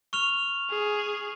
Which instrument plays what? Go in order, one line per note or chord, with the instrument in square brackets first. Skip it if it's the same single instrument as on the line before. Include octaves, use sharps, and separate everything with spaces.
[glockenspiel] C#6 F6 F7
[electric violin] G#4